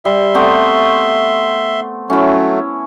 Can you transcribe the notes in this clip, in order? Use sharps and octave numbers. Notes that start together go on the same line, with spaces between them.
G3 E5 C6
A3 B3 C4
F#3 A3 C#4 E4